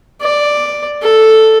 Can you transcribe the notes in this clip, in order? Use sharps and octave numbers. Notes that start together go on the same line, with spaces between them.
D5
A4